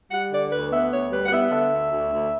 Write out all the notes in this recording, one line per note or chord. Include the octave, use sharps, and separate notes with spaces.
G3 F#5
D3 D5
D2 B4
B3 E5
D2 C#5
G3 B4
F#5
B3 E5
D3 E5
D2
D2
D2